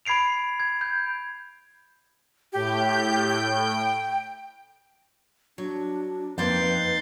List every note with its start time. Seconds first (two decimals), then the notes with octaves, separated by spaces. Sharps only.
0.05 B5 G#6 C7 D7 F7
0.60 G#6
0.81 G6
2.53 A2 G4 G6
3.29 G5
5.58 F#3 D4
6.38 F2 A#3 C4 D#4 B4 C6 G6 A6